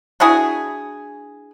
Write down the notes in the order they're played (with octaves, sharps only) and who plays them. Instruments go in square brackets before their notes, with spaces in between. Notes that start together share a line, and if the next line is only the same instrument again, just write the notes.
[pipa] D4 E4 F#4 G#4